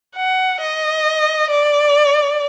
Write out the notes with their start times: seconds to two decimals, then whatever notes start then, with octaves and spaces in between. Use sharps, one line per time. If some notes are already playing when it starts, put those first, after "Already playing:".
0.17 F#5
0.61 D#5
1.50 D5